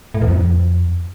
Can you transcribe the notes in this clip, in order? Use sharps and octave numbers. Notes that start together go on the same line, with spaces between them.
A2
E2
F2